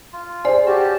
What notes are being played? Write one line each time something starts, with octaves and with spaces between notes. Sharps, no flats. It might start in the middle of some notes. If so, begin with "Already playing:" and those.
F4
G#4 C5 D5 G#5
C#4 F#4 G4 A5